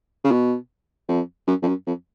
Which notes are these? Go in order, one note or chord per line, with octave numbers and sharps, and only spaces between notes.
C#3
B2
F2
F#2
F2
F#2
F2